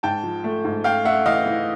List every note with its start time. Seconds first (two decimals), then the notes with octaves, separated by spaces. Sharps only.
0.03 G#2 G5 A5
0.23 F3
0.44 A3
0.64 G#2
0.84 A3 F5 G5
1.05 A3 E5 F#5
1.26 E3 D#5 F5
1.46 E3